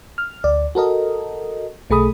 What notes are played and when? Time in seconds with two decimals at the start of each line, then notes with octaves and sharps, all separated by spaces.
0.18 F6
0.44 D2 D5
0.75 F#4 A4 A#4 D#5
1.90 B1 A3 G#4 B5 D#6